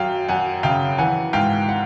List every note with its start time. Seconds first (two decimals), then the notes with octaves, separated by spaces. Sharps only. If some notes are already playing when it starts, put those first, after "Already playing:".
Already playing: F#2 F#3 F5 G5
0.28 F#2 F#5 G#5
0.63 C#3 F5 G5
0.98 E3 F#5 G#5
1.33 G#2 F5 G5
1.69 F#5